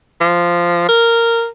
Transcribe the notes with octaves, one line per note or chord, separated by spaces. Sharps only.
F3
A#4